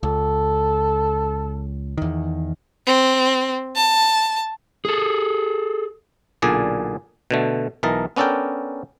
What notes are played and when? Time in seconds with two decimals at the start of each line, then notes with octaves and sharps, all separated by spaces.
0.03 C#2 A4
1.98 E2 D#3
2.86 C4
3.76 A5
4.85 G#4 A4
6.42 B1 A#2 D3 G#4 D5
7.31 B2 D3 A3
7.83 B1 E3 A#4 D#5 A5
8.16 B3 C#4 D4 A4 A#4 G5